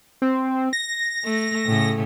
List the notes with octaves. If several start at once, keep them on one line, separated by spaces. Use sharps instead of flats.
C4
A#6
A3
A2 C#3